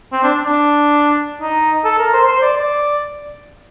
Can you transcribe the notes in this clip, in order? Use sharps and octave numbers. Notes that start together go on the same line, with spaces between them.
C4
D4
D4
D#4
A4
A#4
C5
C5
D5
D5